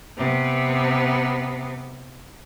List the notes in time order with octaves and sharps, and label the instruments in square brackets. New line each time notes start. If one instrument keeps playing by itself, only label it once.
[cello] C3 B3